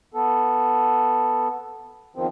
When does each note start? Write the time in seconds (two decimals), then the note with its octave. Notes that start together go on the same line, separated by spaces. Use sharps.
0.14 B3 A4
2.16 E2 D#3 F3 C4